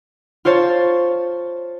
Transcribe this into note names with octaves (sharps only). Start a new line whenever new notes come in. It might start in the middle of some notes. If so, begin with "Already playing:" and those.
F4 C5 C#5 A5